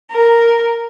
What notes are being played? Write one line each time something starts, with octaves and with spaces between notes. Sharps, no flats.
A#4